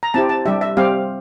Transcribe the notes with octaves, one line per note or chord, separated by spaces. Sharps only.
A#5
C4 E4 G4 A5
A5
G3 D4 G4 E5
E5
G3 C4 G4 F5